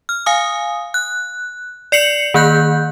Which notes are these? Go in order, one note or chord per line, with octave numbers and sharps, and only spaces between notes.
F6
F5 G#5 D#6
F#6
D5 C7 C#7 F#7
D#3 A#3 F#6 G6